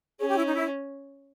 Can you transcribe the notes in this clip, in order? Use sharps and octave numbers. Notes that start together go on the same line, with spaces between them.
C#4 G#4
G4
E4
D#4
E4